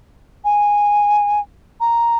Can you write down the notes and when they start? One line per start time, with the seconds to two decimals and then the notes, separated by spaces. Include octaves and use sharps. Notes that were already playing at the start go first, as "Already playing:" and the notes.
0.44 G#5
1.80 A#5